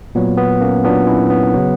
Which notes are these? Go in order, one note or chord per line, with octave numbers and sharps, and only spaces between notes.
A#2 F#3 B3
B3
A#3 C#4
A#2 F#3 B3 D4
C#4 E4
B3
C#3 F#3